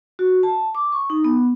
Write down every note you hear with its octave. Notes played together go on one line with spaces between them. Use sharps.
F#4
A5
D6
C#6
D#4
B3